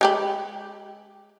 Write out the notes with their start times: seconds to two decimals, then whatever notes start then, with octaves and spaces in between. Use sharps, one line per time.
0.01 G#3 G4 B5